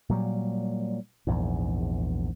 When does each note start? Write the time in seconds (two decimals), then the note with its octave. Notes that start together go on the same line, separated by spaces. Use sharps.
0.09 A#2 F#3 G3
1.27 A#1 E2 G#2